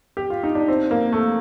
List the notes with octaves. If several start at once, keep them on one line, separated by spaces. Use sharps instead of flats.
G4
F4
D#4
D4
C4
A#3
A3